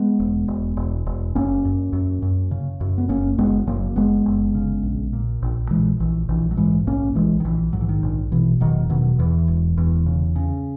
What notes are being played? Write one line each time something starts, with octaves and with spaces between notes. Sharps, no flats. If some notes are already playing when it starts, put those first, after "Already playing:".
Already playing: G#3 B3
E1
E1
E1
E1
F#1 A#3 C#4
F#2
F#2
F#2
C#3
F#2
B3
F#1 A#3 C#4
F#1 G#3 B3
F#1 F#3 A#3
F#1 G#3 B3
F#1
C#3
A#1
A#2
A#1
A#2 E3 G#3
A#1 E3
A#1 E3
F#3
G#2 E3 G#3
A#1 A#3 C#4
A#1 E3 G#3
D#3
A#1 E3
G#2 F#3
E3
D#3
A#1
B2 E3
E1 D#3 F#3
B2 D#3 F#3
E2 E3
E1
E2
C#3
C#3